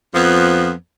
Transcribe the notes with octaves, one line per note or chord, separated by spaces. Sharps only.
F2 F3 B3